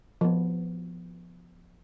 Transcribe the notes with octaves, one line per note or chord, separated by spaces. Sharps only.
F3 B3